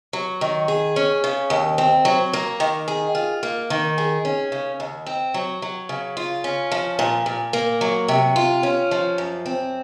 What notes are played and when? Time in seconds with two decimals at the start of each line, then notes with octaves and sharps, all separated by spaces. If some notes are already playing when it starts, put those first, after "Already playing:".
0.13 F#3
0.41 D#3
0.68 G#4
0.96 C#4
1.24 C#3
1.50 D#2
1.78 C4
2.05 F#3
2.33 A#3
2.60 D#3
2.88 G#4
3.15 F4
3.43 A#3
3.70 D#3
3.98 G#4
4.25 C#4
4.52 C#3
4.80 D#2
5.06 C4
5.34 F#3
5.62 F#3
5.89 C#3
6.17 F4
6.44 C#4
6.72 F3
6.99 A#2
7.26 A#2
7.53 A#3
7.81 F#3
8.08 C3
8.36 F4
8.63 C#4
8.91 F3
9.18 F#2
9.46 C4